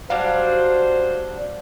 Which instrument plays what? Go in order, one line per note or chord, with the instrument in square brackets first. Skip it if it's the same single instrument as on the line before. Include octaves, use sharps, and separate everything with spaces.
[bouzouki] F#3 G3 D4 [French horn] C5 [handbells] F5